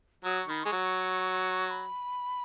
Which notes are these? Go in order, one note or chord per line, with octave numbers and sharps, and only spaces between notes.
F#3 D#6
C#6
D#3 B5
G#3 C#6
F#3
C#6
B5